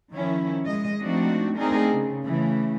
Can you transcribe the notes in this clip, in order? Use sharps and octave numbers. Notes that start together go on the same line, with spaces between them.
D#3 F3 C#4 E4
G#3 D#5
F3 A3 C4 D4 D#4 F#4
A3 C4 D4 D#4 G#4 A#4
C#3
C#3 E3 A3